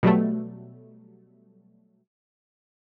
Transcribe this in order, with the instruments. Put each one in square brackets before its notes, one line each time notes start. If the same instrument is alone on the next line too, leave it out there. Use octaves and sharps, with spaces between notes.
[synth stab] B2 F#3 G3 A3